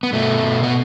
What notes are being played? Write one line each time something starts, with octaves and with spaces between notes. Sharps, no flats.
B3
B2 A3
B2
B3